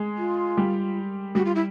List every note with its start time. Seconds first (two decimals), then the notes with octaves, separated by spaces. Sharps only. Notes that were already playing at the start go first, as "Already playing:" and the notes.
Already playing: G#3 G#4
0.18 F4
0.57 G3 G4
1.35 G3 F#4 G4
1.45 F4
1.55 E4